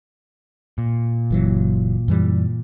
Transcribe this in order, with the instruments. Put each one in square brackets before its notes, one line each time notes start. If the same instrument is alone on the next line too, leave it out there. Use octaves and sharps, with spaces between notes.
[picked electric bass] A#2
[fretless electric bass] F#1 E3 F#3
F#2 E3 G3